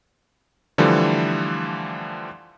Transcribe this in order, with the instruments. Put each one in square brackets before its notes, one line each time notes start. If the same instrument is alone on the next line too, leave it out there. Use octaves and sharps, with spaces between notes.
[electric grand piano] D3 E3 F3 G3 A3